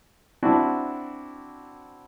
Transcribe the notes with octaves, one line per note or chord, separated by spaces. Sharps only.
C4 D4 E4 F#4 A5